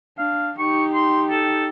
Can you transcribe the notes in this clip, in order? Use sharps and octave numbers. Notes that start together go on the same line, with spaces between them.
D4 F5
D#4 G4 C#6
C6
A4